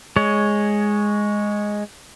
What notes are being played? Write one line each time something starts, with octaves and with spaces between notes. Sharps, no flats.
G#3 C#5